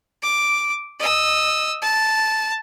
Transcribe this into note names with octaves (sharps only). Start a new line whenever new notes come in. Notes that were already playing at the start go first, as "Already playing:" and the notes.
D6
D#5 E6
A5